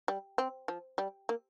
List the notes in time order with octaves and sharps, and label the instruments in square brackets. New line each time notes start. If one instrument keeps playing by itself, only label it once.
[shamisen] G3
C4
F3
G3
A#3